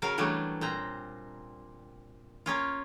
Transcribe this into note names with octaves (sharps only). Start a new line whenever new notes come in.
C#3 F#3 A#4 F5
E3 F#3 G3 A3 D4
A#2 C4 A#5
A#3 C#4 F4